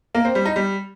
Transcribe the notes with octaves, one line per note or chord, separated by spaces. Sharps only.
A#3
C4
G3
D#4
G3